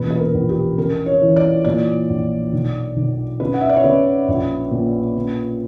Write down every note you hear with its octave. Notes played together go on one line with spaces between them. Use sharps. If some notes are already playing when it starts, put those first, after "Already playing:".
Already playing: E1 A#2 C#3 B4
B4
A#4
A#1
G4
C#3 A#4
C#5
E3
D5
A#2 D5
A#1
B1
B1
C#3 B4
F#5
E5
D5
C#5
C#3 B4
A#1
A#2
C#3